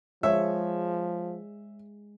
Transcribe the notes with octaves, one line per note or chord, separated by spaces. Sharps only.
F3 G#3 C#5 E5